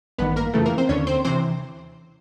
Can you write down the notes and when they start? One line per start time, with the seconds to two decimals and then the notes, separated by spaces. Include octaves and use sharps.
0.18 A1 G2 D#3 B3 B4
0.36 A#3 A#4
0.54 F2 C#3 E3 A3 A4
0.66 A#3 A#4
0.78 C4 C5
0.89 D#2 D3 C#4 C#5
1.07 C4 C5
1.25 C3 E3 C4 C5